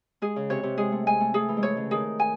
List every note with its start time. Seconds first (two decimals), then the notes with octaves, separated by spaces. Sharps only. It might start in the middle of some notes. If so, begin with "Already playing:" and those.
0.22 G#3 G#4
0.36 C#3
0.50 C3 C#5
0.63 C3
0.78 G#3 G#4
0.92 A3
1.07 G#3 G#5
1.20 A3
1.34 A3 G#4
1.48 E3
1.57 G#3
1.63 A3 C#5
1.77 C#3
1.91 D#3 G#4
2.20 G#5